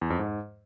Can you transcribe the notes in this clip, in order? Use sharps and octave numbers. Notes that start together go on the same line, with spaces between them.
E2
F2
G#2